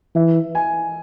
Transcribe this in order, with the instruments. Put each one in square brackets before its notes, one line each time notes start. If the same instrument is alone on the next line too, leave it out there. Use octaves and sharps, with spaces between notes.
[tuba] E3 [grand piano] E5
[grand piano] G#5